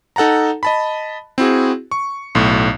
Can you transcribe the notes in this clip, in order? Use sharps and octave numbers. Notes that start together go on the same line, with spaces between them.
D#4 A4 F#5 A5 A#5
D#5 A5 B5
C4 E4 F#4 G#4
C#6
B1 A2